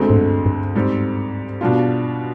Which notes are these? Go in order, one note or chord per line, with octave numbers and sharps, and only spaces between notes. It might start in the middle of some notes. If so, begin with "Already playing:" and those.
Already playing: D2 D3 G#3 C4
G#2
G2
G2
G#2 G3 C4
B2 G3 D4 F4